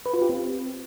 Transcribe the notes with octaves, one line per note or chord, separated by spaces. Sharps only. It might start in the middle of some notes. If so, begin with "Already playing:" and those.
B4
F4
G4
C4